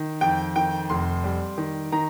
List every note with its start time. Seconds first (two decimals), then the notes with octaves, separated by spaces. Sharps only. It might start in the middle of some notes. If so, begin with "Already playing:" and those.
Already playing: D#3
0.21 F2 G5
0.56 D#3 G5
0.89 F1 C6
1.24 G3
1.58 D#3
1.92 D#3 A#5